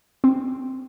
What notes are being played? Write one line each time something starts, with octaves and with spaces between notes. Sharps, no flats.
C4